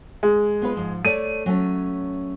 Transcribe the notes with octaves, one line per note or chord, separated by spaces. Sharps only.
G#3
B3 F4 B4
G#2 F3
A3 C#5 D5 D#7
F#3 A3 C#4